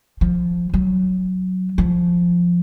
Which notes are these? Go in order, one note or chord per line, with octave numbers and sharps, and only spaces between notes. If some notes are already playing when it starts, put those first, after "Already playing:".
F3
F#3
F3